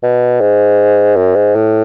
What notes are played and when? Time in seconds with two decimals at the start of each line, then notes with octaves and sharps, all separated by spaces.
0.03 B2
0.41 G#2
1.16 F#2
1.36 G#2
1.55 A2